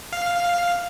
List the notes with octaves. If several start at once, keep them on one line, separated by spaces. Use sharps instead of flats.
F5